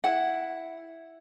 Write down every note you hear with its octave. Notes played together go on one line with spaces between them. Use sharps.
E4 F#5